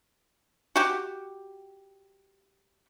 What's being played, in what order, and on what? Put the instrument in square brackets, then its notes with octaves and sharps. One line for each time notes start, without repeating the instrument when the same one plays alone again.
[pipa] F#4 G4